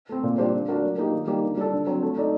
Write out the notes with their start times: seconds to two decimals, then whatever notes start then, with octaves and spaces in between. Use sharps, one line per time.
0.09 A3 C4
0.23 A#2
0.38 G3 D4 G4 C5
0.54 D3
0.68 A3 D4 F#4 A#4
0.83 F#3
0.98 A#3 D#4 G4
1.13 D#3
1.27 G3 A#3 D#4 G4
1.43 D3
1.57 G3 D4 A4
1.72 D3
1.87 F#3 C4
2.02 A3
2.17 D#4 A4 D5